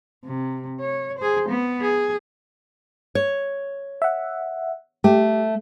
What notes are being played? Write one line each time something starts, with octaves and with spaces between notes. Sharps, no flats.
C3
C#5
G#4 C5
B3
G#4
C#5
E5 F#5
A3 G4